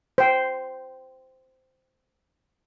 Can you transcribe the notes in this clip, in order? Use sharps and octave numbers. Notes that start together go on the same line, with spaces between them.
C5 G5